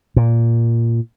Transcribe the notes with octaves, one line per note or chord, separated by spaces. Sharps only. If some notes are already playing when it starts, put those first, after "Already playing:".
A#2